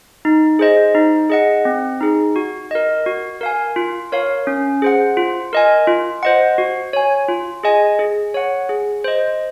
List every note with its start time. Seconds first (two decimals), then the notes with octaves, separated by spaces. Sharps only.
0.25 D#4
0.59 G#4 C5 D#5
0.95 D#4
1.30 G#4 D#5 F#5
1.65 C4
2.01 D#4 G#4
2.36 F#4
2.71 A#4 D#5
3.06 F#4
3.41 A#4 F5 G#5
3.76 F4
4.12 A#4 C#5 F5
4.47 C#4
4.82 G#4 C5 F#5
5.17 F4
5.53 A#4 D#5 G#5
5.87 F4
6.23 C5 D#5 F#5
6.58 F#4
6.93 C#5 G#5
7.29 F4
7.63 G#4 D#5 G#5
7.99 G#4
8.34 C#5 F#5
8.69 G#4
9.04 C5 D#5